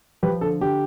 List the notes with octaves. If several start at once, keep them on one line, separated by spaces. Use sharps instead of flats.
F3 G4 B4
D3 A4
D3 G4